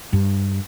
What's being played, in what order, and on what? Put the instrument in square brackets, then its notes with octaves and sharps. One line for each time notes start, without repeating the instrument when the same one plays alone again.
[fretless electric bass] G2